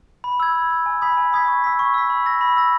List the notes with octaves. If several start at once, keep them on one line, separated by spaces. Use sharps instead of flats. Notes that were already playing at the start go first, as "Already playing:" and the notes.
B5
E6 G#6
B5
E6 G#6
G#5
B5 D#6 G#6 B6
G#5
B5 D#6 G#6 B6
C#6
E6 B6
C#6
E6 B6
B5
E6 A#6
B5
E6 A#6